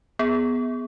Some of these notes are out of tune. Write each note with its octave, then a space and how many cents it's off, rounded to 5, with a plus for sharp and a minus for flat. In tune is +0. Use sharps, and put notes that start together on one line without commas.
B3 +0 G#4 +0